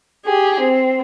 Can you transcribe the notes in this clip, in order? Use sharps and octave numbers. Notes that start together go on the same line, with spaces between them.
G4 G#4
C4